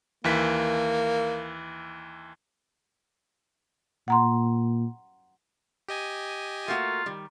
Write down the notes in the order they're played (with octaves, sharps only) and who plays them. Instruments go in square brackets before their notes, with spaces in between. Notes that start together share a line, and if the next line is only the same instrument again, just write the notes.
[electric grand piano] D#2 E3 B6 [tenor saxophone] A#3
[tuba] A#2 [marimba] F#5 A#5 C6
[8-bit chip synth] G4 D#5 G#5
[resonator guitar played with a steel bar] A3 A#3 F#4 [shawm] F4
[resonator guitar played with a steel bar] D#3 G3